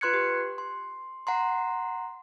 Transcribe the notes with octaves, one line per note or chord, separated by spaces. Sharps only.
F4 B4 C6 F#6 G#6 C#7
G4
C6
F#5 A#5 C6